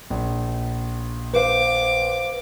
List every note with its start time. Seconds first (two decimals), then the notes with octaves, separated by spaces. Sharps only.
0.10 A#1
1.34 B4 C5 F5 D6